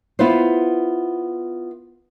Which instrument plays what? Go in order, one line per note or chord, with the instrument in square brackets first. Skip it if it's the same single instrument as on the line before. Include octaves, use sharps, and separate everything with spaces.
[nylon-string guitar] B3 E4 F4 B4 C5